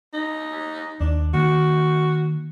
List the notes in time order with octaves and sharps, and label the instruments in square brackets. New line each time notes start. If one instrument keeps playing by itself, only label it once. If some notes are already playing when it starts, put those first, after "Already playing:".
[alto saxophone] D#4
[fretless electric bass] D#2 [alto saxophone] D4
[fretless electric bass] D#3 A#3 [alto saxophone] F#4